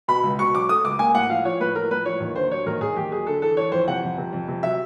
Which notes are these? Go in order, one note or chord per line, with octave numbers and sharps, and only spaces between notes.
B2 B5
C#2
B2 C#6
F#3 D6
A3 D#6
C#2 D6
A#3 G#5
A2 F#5
F3 F5
F3 C#5
A2 B4
F3 A#4
A2 B4
F3 C#5
D#2
D3 C5
F#3 C#5
D#2 A#4
D#2 G#4
D#2 G4
F#3 G#4
D3 A4
E3 A4
E3 C#5
F2 C5
C3 F#5
F2
C3
F2
C3
F#3 E5